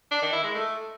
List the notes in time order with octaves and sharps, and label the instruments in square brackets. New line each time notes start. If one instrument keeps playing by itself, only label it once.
[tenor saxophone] D4
D#3
E4
G#3
A3